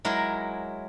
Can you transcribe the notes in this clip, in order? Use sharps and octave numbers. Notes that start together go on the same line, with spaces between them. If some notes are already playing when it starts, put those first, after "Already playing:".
F#3 G#3 E4 A#4